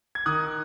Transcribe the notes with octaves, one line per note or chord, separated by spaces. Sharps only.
G#6
D#3 D#6 F#6